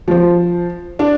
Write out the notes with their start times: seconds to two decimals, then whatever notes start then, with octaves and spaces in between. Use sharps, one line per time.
0.08 F3 C5
0.99 D4 D5